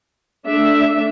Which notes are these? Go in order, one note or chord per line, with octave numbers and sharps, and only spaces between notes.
A3 D4 E5